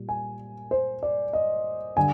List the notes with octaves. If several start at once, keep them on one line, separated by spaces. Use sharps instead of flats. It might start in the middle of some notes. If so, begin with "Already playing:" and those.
Already playing: A#2 G3
G#5
C5
D5
D#5
D3 G3 G#5